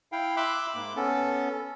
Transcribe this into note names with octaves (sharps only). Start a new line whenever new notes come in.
E4 F5 G5
E5 B5 C6 D6 E6 F#6
G#2 A#3 D6
B3 C#4 A4